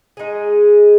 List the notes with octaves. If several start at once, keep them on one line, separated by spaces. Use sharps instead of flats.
G#3 D#4 G#4